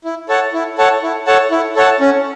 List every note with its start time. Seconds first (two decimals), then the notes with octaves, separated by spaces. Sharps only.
0.05 E4
0.29 A4 C#5 F#5 A5
0.53 E4
0.78 A4 C#5 F#5 A5
1.02 E4
1.27 A4 C#5 F#5 A5
1.51 E4
1.76 A4 C#5 F#5 A5
2.00 C#4